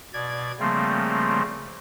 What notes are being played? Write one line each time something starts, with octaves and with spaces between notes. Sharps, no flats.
B2 D5 G#6
C#3 F3 G3 A3 A#3 C4